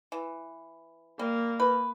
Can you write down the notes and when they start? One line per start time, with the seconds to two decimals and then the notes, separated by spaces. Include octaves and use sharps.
0.12 E3
1.19 G3 A#3
1.60 B4